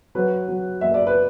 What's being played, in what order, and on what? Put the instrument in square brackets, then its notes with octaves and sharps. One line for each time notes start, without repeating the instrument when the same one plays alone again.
[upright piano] F#3 B4
F#3
F#1 E5
D5
B4